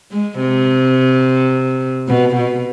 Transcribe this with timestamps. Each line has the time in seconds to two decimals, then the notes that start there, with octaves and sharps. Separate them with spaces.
0.11 G#3
0.40 C3
2.08 B2
2.36 B2